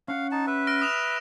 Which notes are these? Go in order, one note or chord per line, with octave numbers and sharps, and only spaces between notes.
C#4 F5 F#5
D#4 A5
B4 E5
F6 A#6 D7
D#6 E7 F7